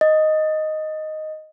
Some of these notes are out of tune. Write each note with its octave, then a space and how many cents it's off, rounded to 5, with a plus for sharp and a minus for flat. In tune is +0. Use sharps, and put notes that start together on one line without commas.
D#5 +0